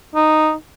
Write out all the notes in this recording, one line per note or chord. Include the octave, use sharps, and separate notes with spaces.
D#4